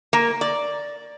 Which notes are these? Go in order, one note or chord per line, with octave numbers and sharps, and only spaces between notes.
A#3
D5